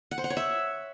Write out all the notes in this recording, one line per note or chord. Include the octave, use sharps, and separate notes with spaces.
F#5
C5
F#5
C#5
E5